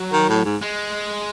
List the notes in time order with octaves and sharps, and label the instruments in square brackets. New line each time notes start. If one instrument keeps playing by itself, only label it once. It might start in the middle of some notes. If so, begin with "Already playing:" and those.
Already playing: [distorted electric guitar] F#3
[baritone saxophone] D#3
A2
G#2
[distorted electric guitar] G#3